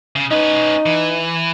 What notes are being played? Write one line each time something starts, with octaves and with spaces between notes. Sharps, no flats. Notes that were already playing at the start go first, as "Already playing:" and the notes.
C#3
C#4 D#4 B4
E3